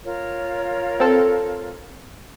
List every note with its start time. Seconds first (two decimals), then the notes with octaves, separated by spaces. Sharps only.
0.04 F4 A#4 C#5
1.00 C4 A4